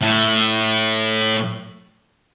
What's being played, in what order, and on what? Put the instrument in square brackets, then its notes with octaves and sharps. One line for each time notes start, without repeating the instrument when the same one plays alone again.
[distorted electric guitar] A2